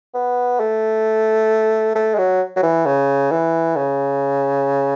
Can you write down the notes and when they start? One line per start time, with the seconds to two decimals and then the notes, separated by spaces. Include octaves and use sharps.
0.14 B3
0.60 A3
1.95 A3
2.14 G#3
2.18 F#3
2.56 F#3
2.63 E3
2.86 C#3
3.31 E3
3.76 C#3